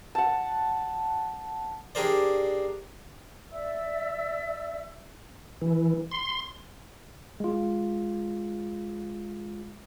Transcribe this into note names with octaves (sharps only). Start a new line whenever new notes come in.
F#5 A5
D4 G4 G#4 A#4 C5 D5
D5 E5 E6
E3
C6
G#3 F4